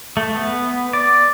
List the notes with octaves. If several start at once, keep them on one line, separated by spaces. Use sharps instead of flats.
A3
B3
D5